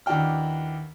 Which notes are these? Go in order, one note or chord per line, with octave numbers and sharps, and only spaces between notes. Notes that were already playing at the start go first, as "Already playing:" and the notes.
D#2 E3 D4 F#4 G5 F6